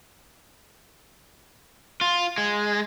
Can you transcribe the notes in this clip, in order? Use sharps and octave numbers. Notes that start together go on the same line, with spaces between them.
F4
G#3